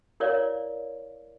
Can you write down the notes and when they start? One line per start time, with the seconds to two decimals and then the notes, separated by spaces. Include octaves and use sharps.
0.20 E4 A#4 C#5 D5 F5